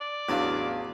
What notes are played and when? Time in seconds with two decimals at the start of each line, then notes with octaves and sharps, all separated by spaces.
0.01 D5
0.29 A1 E2 F#3 D4 F5